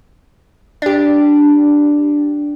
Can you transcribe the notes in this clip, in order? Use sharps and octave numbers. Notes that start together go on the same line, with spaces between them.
D4 G4